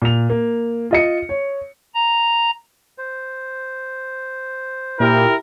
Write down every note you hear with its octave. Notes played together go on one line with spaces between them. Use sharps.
A#2 F7
A#3
F4 D#5 C#7
C#5
A#5
C5
A#2 E4 G4 A#4